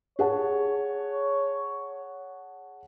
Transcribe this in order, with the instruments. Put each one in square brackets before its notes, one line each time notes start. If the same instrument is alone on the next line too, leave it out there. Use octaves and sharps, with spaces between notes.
[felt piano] G#4 F#5 A5 [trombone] C#5